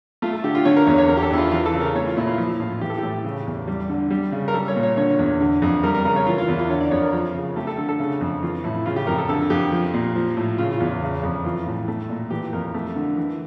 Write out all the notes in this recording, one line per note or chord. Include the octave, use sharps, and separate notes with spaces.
A3 F4
A4
D3 G4
F4
D3 C#5
A#4
E2 C#5
C#5
D3 A#4
G4
A4
E2 E4
F4
E3 F4
A4
C#3
A#4
A3 C#5
F4
A#2 E4
F4
F3 E4
A2 F4
E3 G4
A4
A2 G4
C#3
E2
G3
D3
G3
C#3
A#4
G3 A4
C#5
A#2
C#5
D3 C#5
E2
D3
F2
G3 A#4
A#4
C#3 A#4
C#5
E3 F4
F4
E2 E4
F4
D3 C#5
D5
F2 C#5
A#4
F3
C#3
A3 G4
A4
D3 A4
A4
C#3
F2
E3 F4
A2 E4
C#3 F4
G4
F2 A#4
A4
D3 A4
F2 G4
F3
A#2
F3
A2
C#3 F4
F4
E2
C#3
F2
E3 F4
A2
A3
A#2
E3 G4
F2 A#4
A3
D3
E3